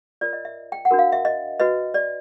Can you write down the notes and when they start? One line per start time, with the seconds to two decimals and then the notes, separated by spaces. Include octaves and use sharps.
0.21 F4 A#4 C#5 D5
0.33 D#5
0.45 E5
0.72 G5
0.85 F#5
0.91 D4 F#4 A#4
0.99 F5
1.12 E5
1.25 D#5
1.60 F#4 B4 D#5
1.94 D5